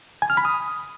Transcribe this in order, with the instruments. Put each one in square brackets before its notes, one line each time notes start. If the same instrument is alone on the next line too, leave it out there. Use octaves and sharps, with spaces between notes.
[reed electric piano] G#5
F6
B5
D#6